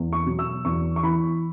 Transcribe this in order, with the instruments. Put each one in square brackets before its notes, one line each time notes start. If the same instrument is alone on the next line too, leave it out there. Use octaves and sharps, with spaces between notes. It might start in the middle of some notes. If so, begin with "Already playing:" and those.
Already playing: [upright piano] E2
C#6
B2 F#3
E6
E2 C#6
C#6
E3 B5